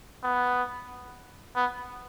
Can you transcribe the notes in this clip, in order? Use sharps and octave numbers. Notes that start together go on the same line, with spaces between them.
B3
B3